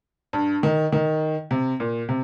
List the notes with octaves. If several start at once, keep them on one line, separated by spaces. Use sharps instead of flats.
G2
D#3
D#3
C3
A#2
C3